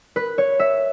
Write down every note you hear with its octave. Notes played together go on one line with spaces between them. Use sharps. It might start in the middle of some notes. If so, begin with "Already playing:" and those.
B4
C#5
E5